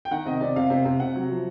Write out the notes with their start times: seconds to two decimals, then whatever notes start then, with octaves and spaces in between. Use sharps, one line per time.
0.05 G5
0.11 D#3 F#5
0.26 C3 D#5
0.41 C3 D5
0.56 C3 F5
0.70 C3
0.85 C3
1.00 C3 F#5
1.15 F#3
1.30 F3